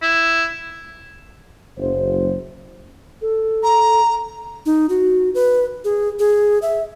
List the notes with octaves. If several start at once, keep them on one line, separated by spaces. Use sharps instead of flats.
E4
F#1 C5
A4
A#5
D#4
F#4
B4
G#4
G#4
E5